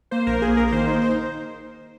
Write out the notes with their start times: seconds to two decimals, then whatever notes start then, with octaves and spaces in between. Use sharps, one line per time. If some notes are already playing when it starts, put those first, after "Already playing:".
0.11 A#3 C5
0.27 A#1 A#4
0.42 A#3 G#4
0.57 A#3 A#4
0.68 A#4
0.72 D#3 C5
0.87 D#4
1.02 D#4 C5